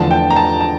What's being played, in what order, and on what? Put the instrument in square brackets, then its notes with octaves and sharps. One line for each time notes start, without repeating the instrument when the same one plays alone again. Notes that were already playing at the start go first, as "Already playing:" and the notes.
Already playing: [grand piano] E2 D3 F3 A3 [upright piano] A5
[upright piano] G5
A#5
A5
A5